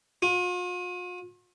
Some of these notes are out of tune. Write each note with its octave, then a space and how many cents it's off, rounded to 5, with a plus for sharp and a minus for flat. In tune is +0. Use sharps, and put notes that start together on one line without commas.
F4 +45